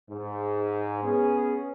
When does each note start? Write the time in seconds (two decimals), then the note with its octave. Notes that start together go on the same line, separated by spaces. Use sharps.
0.10 G#2
1.04 B3 C#4 G#4